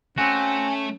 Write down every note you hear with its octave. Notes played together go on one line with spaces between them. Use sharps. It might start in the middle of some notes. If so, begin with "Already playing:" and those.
A3 C4 C#4 F#4 G#5